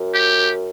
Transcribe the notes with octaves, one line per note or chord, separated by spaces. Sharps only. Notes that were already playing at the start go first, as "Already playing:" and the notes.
Already playing: F#2
G4